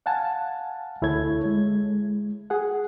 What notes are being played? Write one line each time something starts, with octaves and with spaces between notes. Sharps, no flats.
F5 F#5 G#5 A5
D2 E4 A4 C#5 G#6
G#3
G#4 F#5